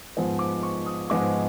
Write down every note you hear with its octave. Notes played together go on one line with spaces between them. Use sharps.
G#2 F3 G#3 B3
D6
C#6
D#6
G#2 F3 G#3 B3 D6